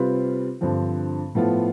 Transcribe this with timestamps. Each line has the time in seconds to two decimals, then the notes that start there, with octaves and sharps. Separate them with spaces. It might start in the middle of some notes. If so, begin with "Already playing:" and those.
Already playing: C3 G3 C4 F4 B4
0.61 G2 D3 F3 C4
1.35 A2 F3 B3 F4